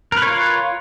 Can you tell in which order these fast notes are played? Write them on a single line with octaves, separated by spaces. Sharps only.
A#4 B4 C#5 F4